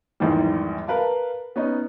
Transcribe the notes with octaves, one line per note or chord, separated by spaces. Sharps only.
A#1 E2 G#2 D#3 G3
A#4 B4 F5 A5
B3 C#4 D#4 D#5